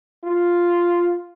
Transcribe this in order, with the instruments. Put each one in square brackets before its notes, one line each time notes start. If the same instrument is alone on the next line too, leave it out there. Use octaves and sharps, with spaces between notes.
[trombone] F4